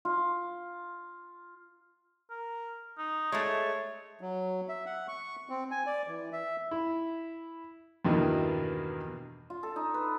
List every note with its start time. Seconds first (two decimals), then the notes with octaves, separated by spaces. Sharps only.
0.05 F4
2.30 A#4
2.98 D#4
3.32 G#3 A3 C#5
4.21 F#3
4.69 E5
4.86 F#5
5.08 C#6
5.49 C4
5.71 G#5
5.86 D5
6.08 E3
6.33 E5
6.71 E4
8.05 E2 G2 B2 D#3 E3 A#3
9.50 F4
9.63 A4
9.76 D#4
9.94 B4